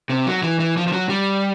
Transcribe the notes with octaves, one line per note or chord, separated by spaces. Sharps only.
C3
F#3
E3
E3
F3
F3
F#3
G3